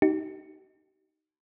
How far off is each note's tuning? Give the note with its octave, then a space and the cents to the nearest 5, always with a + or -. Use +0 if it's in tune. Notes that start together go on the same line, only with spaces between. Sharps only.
D#4 +0 G4 -45